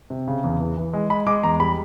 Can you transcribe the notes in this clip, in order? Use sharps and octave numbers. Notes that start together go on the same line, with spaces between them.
C3
C#3
E2
E3
E3
G#3
G#3 B5
G#3 D6
E2 A#5
G3 B5